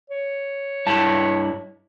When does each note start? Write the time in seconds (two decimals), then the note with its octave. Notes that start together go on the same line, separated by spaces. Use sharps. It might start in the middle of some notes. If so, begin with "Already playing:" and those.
0.10 C#5
0.87 G2 E4 A5